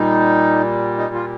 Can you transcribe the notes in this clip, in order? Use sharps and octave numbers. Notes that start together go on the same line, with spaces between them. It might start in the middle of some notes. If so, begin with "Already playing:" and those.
Already playing: A#2 G3 D#4
D#4
F4